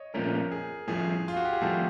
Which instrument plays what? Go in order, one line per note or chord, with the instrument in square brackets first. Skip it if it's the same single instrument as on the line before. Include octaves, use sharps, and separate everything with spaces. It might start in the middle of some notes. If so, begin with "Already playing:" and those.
Already playing: [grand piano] C#5 D#5
[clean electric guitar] A#2 F3 A3 C#4 [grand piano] A#4
[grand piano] G#4
[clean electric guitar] A2 F3 A3 [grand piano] G#4
[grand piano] F4
F#4
G4
G#4
[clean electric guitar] A2 F3 A3 [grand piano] A4